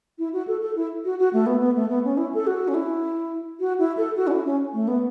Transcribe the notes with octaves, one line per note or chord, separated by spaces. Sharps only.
E4
F#4
A4
A4
E4
F#4
F#4
A3
B3
B3
A3
B3
C#4
E4
A4
F#4
C#4
E4
F#4
E4
A4
F#4
C#4
E4
C#4
A3
B3